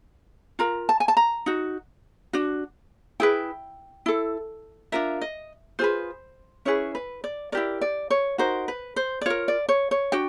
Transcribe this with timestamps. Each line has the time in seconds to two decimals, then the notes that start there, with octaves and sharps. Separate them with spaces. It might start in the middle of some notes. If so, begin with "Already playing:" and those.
0.59 F4 A#4 A#5
0.89 A5
1.00 G#5
1.08 A5
1.17 A#5
1.46 D#4 F#4
2.33 D4 F#4
3.20 E4 G#4 B4 G5
4.06 E4 A4
4.92 D4 F4 A#4 E5
5.21 D#5
5.79 F4 G#4 B4 C5
6.65 C#4 E4 G#4 B4 C#5
6.95 B4
7.24 D5
7.52 E4 G4 A#4 D5
7.81 D5
8.10 C#5
8.38 D#4 F#4 A#4 C5
8.68 B4
8.96 C5
9.21 D5
9.26 F4 A#4 C#5
9.48 D5
9.69 C#5
9.91 C#5
10.12 D4 F#4 G5